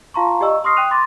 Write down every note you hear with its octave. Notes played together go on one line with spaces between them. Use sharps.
F4 F5 A5 A#5 C6 C#6
G4 D5 D#5 G#5 C#6 E6
C6 C#6 D#6 F6 A#6 C7
G5 D#6 F#6 D#7 F7
B5 C6 D6 A6 A#6